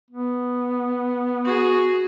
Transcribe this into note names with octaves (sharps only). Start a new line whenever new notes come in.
B3
F#4 G#4